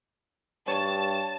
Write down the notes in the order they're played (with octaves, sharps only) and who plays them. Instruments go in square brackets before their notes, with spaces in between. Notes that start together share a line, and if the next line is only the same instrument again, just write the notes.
[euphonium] G2 [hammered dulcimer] C#5 [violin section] A5